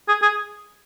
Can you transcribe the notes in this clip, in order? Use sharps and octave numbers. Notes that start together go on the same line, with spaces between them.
G#4
G#4